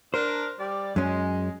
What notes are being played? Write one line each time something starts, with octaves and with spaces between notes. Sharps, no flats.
D4 A#4 C5
G3 D5
F#2 G#3 C#4